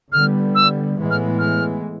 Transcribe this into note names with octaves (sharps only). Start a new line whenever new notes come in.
D3 G3 B3 F6
E6
A2 E3 G#3 B3
F6
F6